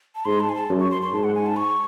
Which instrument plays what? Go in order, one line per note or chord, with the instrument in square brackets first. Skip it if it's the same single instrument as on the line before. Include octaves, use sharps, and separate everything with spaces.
[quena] A5
[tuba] G#2 [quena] C6
[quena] A5
G#5
A5
[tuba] F#2
[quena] C#6
C6
C6
[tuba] G#2 [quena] A5
[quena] F#5
G#5
A5
C#6